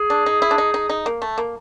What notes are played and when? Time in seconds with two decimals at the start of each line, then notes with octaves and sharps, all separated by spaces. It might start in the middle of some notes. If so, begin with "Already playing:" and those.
Already playing: G#4
0.10 D4
0.26 D#4
0.42 E4
0.51 D4
0.58 D#4
0.74 D#4
0.89 D#4
1.06 A#3
1.22 A3
1.38 A#3